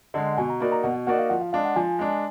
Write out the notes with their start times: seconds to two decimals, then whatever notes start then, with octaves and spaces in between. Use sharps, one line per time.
0.14 D3 G#3 D#5
0.27 F#5
0.38 B2 G#5
0.50 A#5
0.60 A#3 D#4 F#4 D5 B5
0.72 A#5
0.84 B2 F#5
1.07 A#3 D#4 F#4 D5 F#5
1.19 F5
1.30 F3 F#5
1.41 F5
1.53 G#3 D4 F5
1.65 F#5
1.76 F3 G#5
1.99 G#3 D4